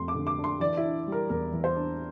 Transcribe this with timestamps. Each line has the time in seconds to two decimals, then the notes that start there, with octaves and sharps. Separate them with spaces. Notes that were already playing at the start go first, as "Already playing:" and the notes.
Already playing: F2 A3 C6
0.08 D6
0.14 D3
0.27 D6
0.38 D4
0.44 C6
0.60 E3 D5
0.77 E4
0.83 D4
1.07 G3
1.12 A#4
1.29 E2 A#4
1.52 E3
1.64 C5
1.76 D4